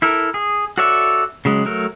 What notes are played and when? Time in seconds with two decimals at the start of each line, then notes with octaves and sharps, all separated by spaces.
0.02 E4 A4 A#4
0.34 G#4
0.78 F#4 A4 C#5 D5 E5
1.45 C#3 F#3 G#3
1.65 F#3 A3 A#4